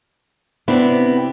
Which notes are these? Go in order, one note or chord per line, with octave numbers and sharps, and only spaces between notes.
C3 B3 C4 D4 E4